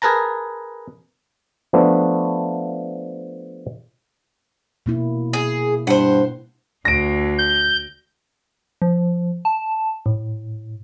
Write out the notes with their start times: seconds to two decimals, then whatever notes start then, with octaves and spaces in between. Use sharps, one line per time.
0.02 G#4 A#4 B4 A5 A#5
1.73 F3 A3 B3 D4
4.86 B2 A#3 E4
5.33 G#4
5.87 G2 C5 F#5
6.85 D2 A#6 D7
7.38 G6
8.82 F3
9.45 A5
10.06 A2